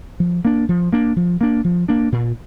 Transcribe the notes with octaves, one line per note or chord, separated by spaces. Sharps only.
F3
A#3 D4
F3
A#3 D4
F3
A#3 D4
F3
A#3 D4
A#2